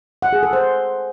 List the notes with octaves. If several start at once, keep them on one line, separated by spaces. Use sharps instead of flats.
F#5
G#4
A4
C5